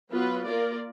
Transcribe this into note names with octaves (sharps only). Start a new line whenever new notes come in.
F#3 B3 F4 B4
A#3 F4 A#4 D5